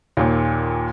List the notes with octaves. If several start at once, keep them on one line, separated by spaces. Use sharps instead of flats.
D#2 A#2